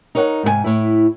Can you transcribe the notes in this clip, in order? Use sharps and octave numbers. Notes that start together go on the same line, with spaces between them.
D#4 A#4 C#5 E5 F#5
G#2 C3 A4 G#5
A2 E4